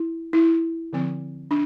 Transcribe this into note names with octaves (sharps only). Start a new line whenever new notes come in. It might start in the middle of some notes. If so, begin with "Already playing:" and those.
Already playing: E4
E4
D3 F3 C4
D4